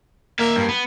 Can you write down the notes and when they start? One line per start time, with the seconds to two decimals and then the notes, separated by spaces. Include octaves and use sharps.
0.39 A#3 E5 F5
0.56 G2
0.69 B3